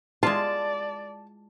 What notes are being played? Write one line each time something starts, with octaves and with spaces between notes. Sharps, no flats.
G#3 F4 D5 A5